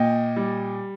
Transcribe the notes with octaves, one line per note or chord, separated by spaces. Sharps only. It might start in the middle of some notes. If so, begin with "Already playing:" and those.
Already playing: A#2 D#5 G5
G3